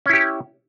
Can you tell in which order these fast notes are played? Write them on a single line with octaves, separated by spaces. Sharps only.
C#4 E4 G4